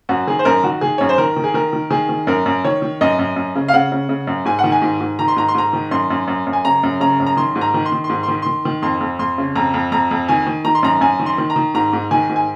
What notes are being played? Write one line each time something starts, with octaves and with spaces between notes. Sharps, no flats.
F#2 F#4
D#3 G#4
C5
F#2 A#4
D#3 F#4
D#3 G#4
F#2 C#5
C5
D#3 A#4
D#3
G#4
D#3 A#4
D#3
D#3 G#4
D#3
F#2 A#4
F#2
D#3 C#5
D#3
F#2 D#5
F#2
F#2
C#3
F5
C#3 F#5
C#3
C#3
F#2
G#2 G#5
F#5
D#3
G#5
G#2
G#2
D#3 A#5
C6
G#2 A#5
C6
G#2 A#5
D#3
F#2 C6
F#2
F#2
F#2
G#5
C#3 A#5
F#2
C#3 A#5
F#2
A#5
D#3 C6
G#2
A#5
D#3
C6
D#3
C6
G#2
C6
D#3
D#3 C6
D#3
F2 C6
F2
F2 C6
C#3
F2 A#5
F2
F2 A#5
F2
D#3 G#5
D#3
D#3 A#5
C6
F#2 A#5
F#2 G#5
D#3
C6
D#3
A#5
D#3
G#2 A#5
G#2
D#3 G#5
G#2
G#5